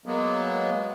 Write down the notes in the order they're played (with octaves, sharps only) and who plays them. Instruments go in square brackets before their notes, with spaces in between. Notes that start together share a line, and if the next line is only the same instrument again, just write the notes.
[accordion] F#3 G#3 A#3 B3